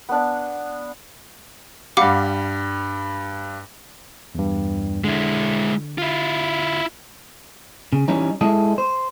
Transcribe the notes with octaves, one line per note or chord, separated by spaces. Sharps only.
B3 D4
G2 G3 F5 F#5 D6
E2 G2
D3 G#3 E4
E4 F4
C#3
E3 G3 C#4 D#4
G#3 E4 A4 D#5
C5